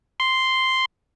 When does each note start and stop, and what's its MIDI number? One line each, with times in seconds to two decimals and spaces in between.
0.20 0.85 84